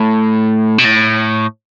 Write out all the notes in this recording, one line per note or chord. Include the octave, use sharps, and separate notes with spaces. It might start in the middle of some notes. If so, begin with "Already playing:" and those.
Already playing: A2
B2
A2